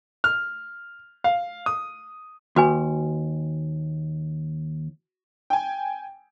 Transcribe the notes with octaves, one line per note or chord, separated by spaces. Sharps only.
F6
F5
D#6
D#2 F#4 B4 G#5
G5 G#5